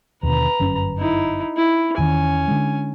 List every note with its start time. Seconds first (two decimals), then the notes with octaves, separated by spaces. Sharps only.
0.23 D#2 B2 D3 B4 A#5
0.60 G1 F#2 C#4
0.98 D#4 E4
1.57 E4
1.98 E2 D#3 C#4 G#5
2.48 D3 G#3